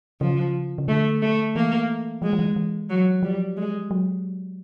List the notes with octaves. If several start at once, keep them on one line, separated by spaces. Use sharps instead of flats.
C#3 F3
C#3
D3 A3
A3
E3 A#3
F3 G#3
F3
E3
E3
F#3
F3 G3
G#3
F#3